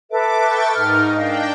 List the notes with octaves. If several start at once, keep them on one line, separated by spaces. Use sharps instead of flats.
A4 B4 E5 D6
G5 C#6 A6
G#2 D#4 A#4 F6
D4 D#5 F5 G5